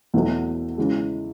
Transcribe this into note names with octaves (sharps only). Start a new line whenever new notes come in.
E2 B2 F#3 A3
C#3 E3 G#3